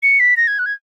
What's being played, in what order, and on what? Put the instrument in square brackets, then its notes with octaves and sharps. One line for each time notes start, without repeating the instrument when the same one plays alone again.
[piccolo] C#7
B6
A#6
G#6
F#6
G#6